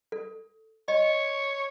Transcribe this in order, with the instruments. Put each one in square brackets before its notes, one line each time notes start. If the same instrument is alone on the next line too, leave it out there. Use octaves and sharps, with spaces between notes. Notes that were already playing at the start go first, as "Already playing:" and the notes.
[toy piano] A4
[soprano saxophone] C#5 [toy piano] D#5